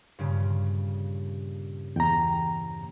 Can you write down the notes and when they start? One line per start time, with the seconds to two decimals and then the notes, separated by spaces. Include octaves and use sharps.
0.19 G2 A#2 C#3
1.96 E2 G5 A#5